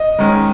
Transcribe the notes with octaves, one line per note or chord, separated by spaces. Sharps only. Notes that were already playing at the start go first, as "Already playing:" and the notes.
Already playing: D#5
G#2 D#3 G#3 C#4